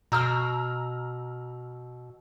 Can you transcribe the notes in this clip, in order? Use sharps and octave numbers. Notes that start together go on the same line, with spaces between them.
B2 A#5 E6 F6